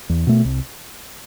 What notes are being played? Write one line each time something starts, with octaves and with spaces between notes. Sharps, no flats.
E2
B2 A3
C2